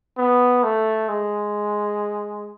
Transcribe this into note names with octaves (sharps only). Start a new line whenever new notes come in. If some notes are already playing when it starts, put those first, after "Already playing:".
B3
A3
G#3